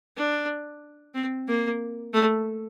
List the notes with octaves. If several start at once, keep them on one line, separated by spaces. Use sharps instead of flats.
D4
C4
A#3
A3